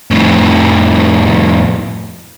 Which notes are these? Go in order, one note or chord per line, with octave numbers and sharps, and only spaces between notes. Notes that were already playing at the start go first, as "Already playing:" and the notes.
F2 A2